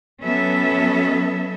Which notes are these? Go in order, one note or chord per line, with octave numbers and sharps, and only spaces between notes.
F#3 B3 C#4 A4 E5